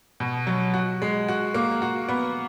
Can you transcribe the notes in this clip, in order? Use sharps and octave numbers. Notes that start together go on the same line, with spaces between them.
B2
F#3
F#4
G#3
F#4
A#3
F#4
B3